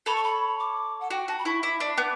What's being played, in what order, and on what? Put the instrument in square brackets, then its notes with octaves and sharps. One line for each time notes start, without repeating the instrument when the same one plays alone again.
[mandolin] A4 C#5 [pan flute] B5
[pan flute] C#6
B5
D6
F#5
[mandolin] F#4 [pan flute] G5
[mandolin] F#4 [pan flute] A5
[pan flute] B5
[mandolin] E4 [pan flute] C#6
[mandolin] E4 [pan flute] D6
[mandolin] D4
B3